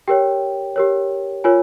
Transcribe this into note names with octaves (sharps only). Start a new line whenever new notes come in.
G4 A#4 C#5 G5
G4 A#4 C#5
F4 A#4 C#5 G#5